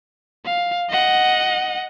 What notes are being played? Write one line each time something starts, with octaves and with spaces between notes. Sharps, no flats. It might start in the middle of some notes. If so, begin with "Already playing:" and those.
F5
D#5 F#5